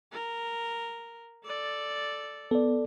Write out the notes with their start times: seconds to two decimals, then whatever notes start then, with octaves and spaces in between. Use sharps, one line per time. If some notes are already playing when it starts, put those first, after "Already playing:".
0.13 A#4
1.45 A4 D5
2.51 B3 A4 D5